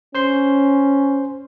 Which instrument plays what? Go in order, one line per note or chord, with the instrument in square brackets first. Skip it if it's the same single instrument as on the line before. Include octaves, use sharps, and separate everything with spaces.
[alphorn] C#4 [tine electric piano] C5 C6